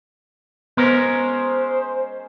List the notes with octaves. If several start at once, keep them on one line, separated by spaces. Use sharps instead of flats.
G#3 B3 C#4 A#4 C5